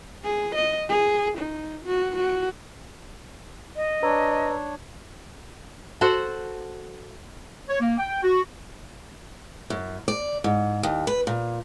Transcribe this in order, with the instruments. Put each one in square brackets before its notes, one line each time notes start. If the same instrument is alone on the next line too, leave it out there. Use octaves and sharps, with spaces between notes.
[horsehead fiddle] G#4
D#5
G#4
D#4
F#4
F#4
[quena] D#5
[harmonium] D4 C#5 [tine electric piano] B4 A#5 E6
[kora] F#4 A4 C5 F#5
[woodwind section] C#5
A#3
G5
F#4
[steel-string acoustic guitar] F#2
D5
G#2
D#2
B4
A#2